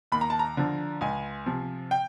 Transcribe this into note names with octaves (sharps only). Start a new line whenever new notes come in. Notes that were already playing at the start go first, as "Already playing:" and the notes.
D#2 B5
A#5
A5
A#5
D3 F3
C#2 G#5
C3 F3
G5